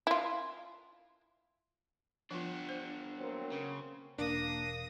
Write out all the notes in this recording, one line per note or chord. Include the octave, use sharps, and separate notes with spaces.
E4 F4
F3 B3 D4 F4
C5
F#3 A#3 C4
C#3
E1 A#3 C#4 D4 D#6 A#6